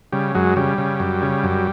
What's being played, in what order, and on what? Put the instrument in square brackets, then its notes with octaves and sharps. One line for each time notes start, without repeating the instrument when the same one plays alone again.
[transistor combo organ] C#3 G3
F#2 F#3 G#3
C#3 G3
C#3
F#2
C#3
F#2